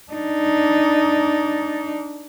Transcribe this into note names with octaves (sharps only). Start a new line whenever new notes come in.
D4 D#4